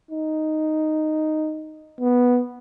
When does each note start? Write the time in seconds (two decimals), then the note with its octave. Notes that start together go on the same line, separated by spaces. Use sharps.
0.11 D#4
2.00 B3